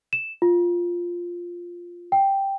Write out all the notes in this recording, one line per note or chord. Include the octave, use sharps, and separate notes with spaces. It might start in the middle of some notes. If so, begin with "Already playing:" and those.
E7
F4
G5